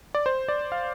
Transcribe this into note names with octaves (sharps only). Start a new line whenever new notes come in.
D5
C5
D5
F5